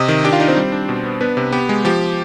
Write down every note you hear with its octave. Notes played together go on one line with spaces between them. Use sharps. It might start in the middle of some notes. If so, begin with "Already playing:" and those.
Already playing: C3 D#5 D#6
D#3
D4 G4 G5
F4 F5
D4 D#4 D#5
C4 C5
G3
D4
B2
B3
B3 D4 B4
C3
B3 G4
G#3
F3 G4